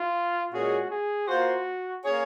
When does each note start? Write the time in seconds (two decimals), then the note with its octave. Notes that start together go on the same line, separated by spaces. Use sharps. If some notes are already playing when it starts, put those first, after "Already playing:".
Already playing: F4
0.52 A#2 G#3 C#4 F#4 G#4
0.91 G#4
1.28 A#3 F4 F#4 C5
2.04 A#3 C#4 G#4 C#5